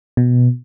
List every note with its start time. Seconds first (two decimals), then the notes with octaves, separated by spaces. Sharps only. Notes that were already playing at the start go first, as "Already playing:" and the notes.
0.17 B2